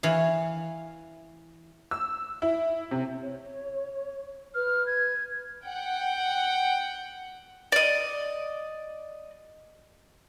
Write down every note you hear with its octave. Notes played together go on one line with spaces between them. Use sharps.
E3 C#5 F5
E6
E4
C3
C#5
B4 F6
G#6
F#5 G5
D5 D#5